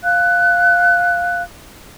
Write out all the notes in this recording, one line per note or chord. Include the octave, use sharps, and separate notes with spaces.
F5 F#6